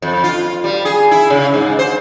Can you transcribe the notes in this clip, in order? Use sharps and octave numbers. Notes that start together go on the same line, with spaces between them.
F2
F4
G3
G#4
E4
C#3
G#2
C5